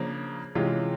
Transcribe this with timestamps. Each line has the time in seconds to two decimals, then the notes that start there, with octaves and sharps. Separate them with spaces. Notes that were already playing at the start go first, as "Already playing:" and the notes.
Already playing: C#3 F3 A#3 D4
0.55 C3 E3 G#3 C#4 F4